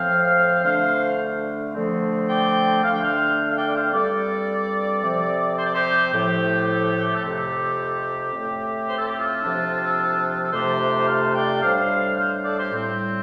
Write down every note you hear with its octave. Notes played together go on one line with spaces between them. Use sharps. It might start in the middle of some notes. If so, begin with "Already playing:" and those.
Already playing: A2 F3 C4 C5 F5
D3 A3 D4 C5 F5
D3 F3 A3 C4
D5 G5
D3 A3 D4 F5
G5
C5 F5
F5
D5 G5
D5
C5 F5
G2 G3 C4 A4 D5
C3 F3 C4
C5
D5
G4 C5
A2 F3 A3 G4
A4
F2 C3 A3 C4 G4
A2 A3 C4
C5
A4
G4
F4 A4
C3 F3 D4
A4
F2 C3 A3 D4 G4 C5
C5 F5
D5 G5
A2 G3 D4 C5 F5
C5 F5
A4 D5
G4 C5
A2 G3 C4